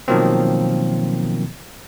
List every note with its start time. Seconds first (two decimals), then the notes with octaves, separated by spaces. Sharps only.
0.08 B2 D#3 F3 F#3 A#3 C4